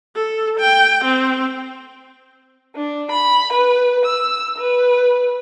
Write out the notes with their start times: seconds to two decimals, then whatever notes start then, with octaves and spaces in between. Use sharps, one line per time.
0.16 A4
0.60 G5
1.05 C4
2.76 D4
3.11 B5
3.53 B4
4.06 E6
4.58 B4